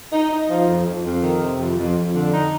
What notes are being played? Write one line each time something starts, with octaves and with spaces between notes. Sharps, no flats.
D#4
D#4
F3
F2
F2
F2
D#3
C3
F2
F2
F2
D3
D#4